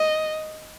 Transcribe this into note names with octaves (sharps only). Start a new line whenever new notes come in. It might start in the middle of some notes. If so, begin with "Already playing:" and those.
Already playing: D#5